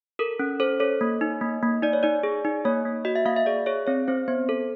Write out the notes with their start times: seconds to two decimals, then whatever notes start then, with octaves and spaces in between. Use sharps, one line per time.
0.19 A4 A#4
0.39 C#4
0.60 A4 C5
0.80 A4 C#5
1.01 A#3
1.21 D#4
1.41 A#3
1.63 A#3
1.83 D#4 D5
1.93 C#5
2.03 D#4 D5
2.23 G#4
2.45 D#4
2.65 A#3 C#5
2.85 A#3
3.05 F#4 D#5
3.16 E5
3.26 A#3 F5
3.36 E5
3.46 G#4 D5
3.66 G#4 C#5
3.87 C4 C#5
4.08 C4 C5
4.28 B3 C5
4.49 A4